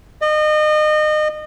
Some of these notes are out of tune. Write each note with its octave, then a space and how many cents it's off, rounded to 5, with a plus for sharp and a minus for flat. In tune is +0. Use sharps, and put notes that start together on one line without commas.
D#5 -30